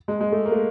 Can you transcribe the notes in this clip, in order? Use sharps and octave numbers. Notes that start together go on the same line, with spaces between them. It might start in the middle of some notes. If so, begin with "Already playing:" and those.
G#3
G#3
A3
A#3
A3